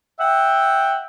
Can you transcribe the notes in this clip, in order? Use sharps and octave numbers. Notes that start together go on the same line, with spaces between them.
E5 F#5 G5